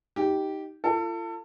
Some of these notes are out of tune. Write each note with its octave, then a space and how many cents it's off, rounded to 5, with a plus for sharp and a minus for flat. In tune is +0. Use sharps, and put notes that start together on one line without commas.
D#4 +10 G4 -10
F4 -40 A4 +30